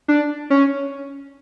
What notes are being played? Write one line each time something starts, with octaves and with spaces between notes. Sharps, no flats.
D4
C#4